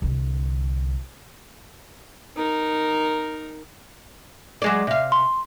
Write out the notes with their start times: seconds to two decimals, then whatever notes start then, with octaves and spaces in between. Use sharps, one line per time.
0.02 C2 D3
2.37 D#4 A#4
4.62 F#3 G#3 D5
4.87 C3 F5
5.12 C6